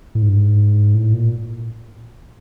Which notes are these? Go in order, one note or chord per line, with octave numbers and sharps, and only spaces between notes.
A2
G#2
G2
G#2
A2
A#2